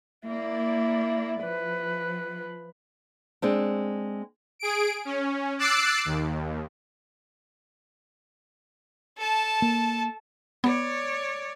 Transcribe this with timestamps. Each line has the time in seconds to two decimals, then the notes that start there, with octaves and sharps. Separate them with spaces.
0.28 A#3 E4 D5
1.43 F3 B4
3.42 G#3 C4 D4
4.59 G#4 D7
5.05 C#4
5.58 D6 E6 F#6 A6 C7 D7
6.05 D#2
9.17 A4 A5
9.62 A#3
10.64 B3 C#5 D5